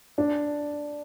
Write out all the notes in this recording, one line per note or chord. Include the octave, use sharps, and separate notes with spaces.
D4